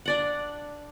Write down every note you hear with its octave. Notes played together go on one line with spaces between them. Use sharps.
D4 D5 F#5